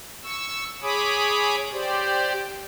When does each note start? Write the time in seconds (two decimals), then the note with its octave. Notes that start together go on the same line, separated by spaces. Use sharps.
0.23 C#6 E6
0.82 G#4 C#5 G#5 B5 D6 D#6
1.72 G4 C5 D5